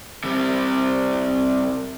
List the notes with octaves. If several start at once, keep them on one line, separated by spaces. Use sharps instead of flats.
C3 G3